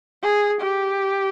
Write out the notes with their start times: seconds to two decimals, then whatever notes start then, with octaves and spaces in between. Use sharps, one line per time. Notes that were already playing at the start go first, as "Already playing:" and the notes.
0.24 G#4
0.61 G4